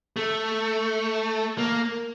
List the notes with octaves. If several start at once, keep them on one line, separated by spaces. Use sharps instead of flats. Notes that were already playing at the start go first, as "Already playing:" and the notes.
A3
A#3